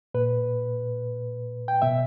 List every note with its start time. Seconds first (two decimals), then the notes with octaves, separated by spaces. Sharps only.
0.14 A#2 B4
1.68 G5
1.82 B2 E5